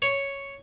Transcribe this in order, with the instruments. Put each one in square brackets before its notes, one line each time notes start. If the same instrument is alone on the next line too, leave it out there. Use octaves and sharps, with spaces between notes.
[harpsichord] C#5